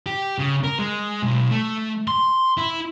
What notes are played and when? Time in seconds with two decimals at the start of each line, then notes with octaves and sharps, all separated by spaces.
0.06 G4
0.38 C#3
0.64 A#4
0.79 G#3
1.23 B1
1.51 A3
2.08 C6
2.57 E4